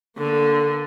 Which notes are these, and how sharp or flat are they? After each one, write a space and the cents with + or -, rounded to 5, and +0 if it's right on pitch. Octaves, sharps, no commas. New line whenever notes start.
D3 +0 A#3 +25